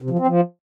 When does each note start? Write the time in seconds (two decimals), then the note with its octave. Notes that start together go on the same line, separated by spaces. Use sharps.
0.02 C3
0.10 F3
0.19 C4
0.27 F3